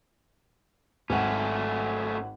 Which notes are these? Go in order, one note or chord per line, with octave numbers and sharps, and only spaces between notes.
G#1 F#3 A3 C#4 F#5